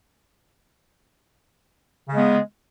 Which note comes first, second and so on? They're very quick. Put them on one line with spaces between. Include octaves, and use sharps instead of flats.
C#3 G#3 B3